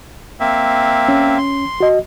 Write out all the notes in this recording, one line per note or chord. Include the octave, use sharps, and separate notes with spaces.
A#3 C4 E5
C#4
C6
F#4 D#5